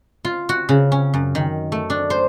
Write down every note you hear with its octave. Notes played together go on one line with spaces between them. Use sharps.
F4
F#4
C#3
C#4
F#2
D#3
A3
D4
C5